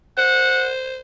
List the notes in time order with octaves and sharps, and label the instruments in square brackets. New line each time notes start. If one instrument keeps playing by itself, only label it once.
[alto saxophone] C5 [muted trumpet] F#5